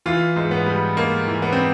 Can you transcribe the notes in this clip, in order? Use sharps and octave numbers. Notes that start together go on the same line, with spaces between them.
E3 F4
G#2
B3
G3
G#2 A#3
E3
B3
C4